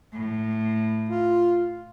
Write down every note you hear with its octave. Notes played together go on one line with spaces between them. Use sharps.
A2
F4